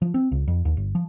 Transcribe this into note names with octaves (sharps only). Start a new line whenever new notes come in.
F3
C4
C#2
F2
D#2
G1
F3